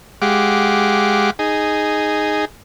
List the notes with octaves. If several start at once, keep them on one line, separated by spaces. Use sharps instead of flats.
G#3 G4 F5 F#5 D6
D#4 G#4